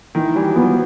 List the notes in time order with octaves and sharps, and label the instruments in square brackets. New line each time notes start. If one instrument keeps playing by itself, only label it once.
[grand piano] D#3 [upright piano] E3
[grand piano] E3 [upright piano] G3
[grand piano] F#3
[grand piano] F3 [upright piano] B3